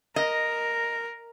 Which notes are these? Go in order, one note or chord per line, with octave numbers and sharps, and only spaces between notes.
A#4 D#5